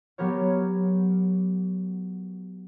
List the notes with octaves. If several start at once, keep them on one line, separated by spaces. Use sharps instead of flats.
F#3 B3 G4 A#4 C#5